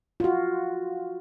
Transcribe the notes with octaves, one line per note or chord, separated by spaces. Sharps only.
F4 F#4